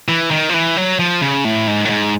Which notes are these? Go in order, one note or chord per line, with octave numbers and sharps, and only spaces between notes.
E3
D#3
F3
E3
F#3
F3
C#3
A2
G#2
A2
G#2